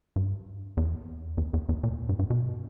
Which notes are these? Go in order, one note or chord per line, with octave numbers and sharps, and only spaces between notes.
G2
E2
E2
E2
E2
A#2
G2
G2
B2